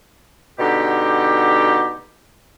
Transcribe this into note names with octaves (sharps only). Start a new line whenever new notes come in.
B2 D3 D#4 G4